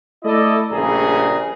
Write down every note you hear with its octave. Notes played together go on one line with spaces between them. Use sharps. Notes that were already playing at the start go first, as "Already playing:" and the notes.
A3 E4 A4 D5 D#5
A#1 G2 A#2 C#3 G#4 A#5